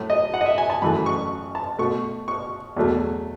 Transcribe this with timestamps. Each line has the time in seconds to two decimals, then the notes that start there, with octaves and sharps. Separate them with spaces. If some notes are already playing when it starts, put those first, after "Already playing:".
Already playing: A2 F#3 A3
0.10 D#5
0.34 F#5
0.41 D#5
0.46 E5
0.58 G#5
0.70 A5
0.82 F#2 E3 A3 B5
1.06 C#6
1.55 A5
1.79 B2 A3 C#6
2.28 C#6
2.76 E2 B2 F#3 A3